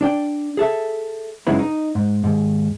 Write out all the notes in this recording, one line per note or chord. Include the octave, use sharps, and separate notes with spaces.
D4 D5 G5
G#4 A4 E5
F#2 C#3 G#3 B3 D#4 E4
D#4
G#2
D#2 G#2